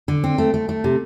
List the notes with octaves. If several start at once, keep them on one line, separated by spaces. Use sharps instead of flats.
D3
C4
A3
A3
A3
C3